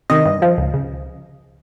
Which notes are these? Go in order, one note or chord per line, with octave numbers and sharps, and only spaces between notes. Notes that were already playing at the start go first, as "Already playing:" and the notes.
C3 D#3 D#5
G2
F3
C#2
C#3